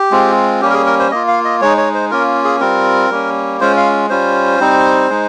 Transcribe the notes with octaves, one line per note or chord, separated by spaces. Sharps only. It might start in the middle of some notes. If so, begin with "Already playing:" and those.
Already playing: G4
G#3 C4 F4
G3 A#3 C#4 G4
A#4
G#4
A#4
C5
A#3 F4 D#5
F5
D#5
G#3 D#4 C#5
C#5
C5
A#3 C#4 F4 A#4
G#4
G3 C4 F4 A#4
G3 A#3 C#4
G#3 C#4 F4 C5
F5
G3 C#4 F4 C5
G3 C4 D#4
G#3 D#4